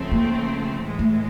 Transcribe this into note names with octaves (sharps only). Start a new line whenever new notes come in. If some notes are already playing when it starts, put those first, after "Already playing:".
Already playing: C#2 C#3 F3 A3 C4
A#3
A2 E3 G#3
A3